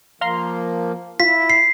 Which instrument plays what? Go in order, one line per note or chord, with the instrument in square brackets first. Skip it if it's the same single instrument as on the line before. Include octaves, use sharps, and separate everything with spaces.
[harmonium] F3 A#3 [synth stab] F5 A#5 C6
[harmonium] E4 [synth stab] F4 [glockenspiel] B6
[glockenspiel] C7